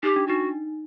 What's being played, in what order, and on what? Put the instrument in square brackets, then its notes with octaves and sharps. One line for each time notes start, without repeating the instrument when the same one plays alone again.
[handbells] D#4 [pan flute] G4
[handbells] D4
[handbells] D#4 [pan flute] F#4